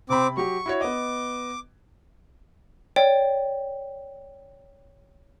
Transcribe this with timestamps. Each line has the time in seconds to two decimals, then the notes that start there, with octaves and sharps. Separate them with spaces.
0.10 C3 C4 B5 D6
0.37 F#3 G4 C#6
0.66 E4 F#4 C#5
0.81 B3 D#5 D6
2.96 C#5 D5 G5